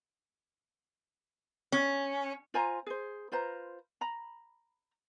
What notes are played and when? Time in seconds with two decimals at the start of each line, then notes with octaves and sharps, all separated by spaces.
1.72 C#4
2.54 F4 C5 G#5 A#5
2.87 G#4 C5
3.32 F4 B4 C5 A#5
4.01 A#5 B5